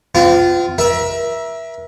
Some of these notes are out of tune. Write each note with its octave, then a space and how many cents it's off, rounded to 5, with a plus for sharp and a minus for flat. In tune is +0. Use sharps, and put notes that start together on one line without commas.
C4 -40 F4 +0
A#4 +35 E5 +0